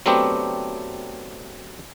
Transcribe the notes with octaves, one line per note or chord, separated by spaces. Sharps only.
F#3 A3 B3 C4 D4 G4